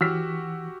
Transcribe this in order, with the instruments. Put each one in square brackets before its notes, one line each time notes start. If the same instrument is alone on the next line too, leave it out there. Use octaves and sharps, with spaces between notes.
[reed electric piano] E3 [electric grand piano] F#4 G4 [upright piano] E6 F6 B6